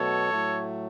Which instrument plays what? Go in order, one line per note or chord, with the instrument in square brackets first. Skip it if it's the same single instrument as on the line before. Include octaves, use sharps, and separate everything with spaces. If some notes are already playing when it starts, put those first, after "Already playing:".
Already playing: [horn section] B2 F#3 A3 A4 C#5
A2 F#3 A3